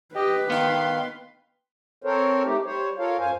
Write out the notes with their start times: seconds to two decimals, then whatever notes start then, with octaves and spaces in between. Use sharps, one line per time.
0.15 G4 B4 D#5
0.50 D#3 B3 F5 G5 C6
2.04 C4 A4 A#4 C5 C#5
2.45 A3 D#4 G4
2.65 G3 C5 C#5
2.98 F4 A4 A#4 C#5 F5
3.19 F#2 C5 F5 G#5